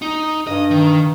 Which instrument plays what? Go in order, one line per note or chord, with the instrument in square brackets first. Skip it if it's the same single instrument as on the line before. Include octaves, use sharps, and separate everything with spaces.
[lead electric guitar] D#4
[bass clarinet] G2 [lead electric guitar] D#5
[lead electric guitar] D#3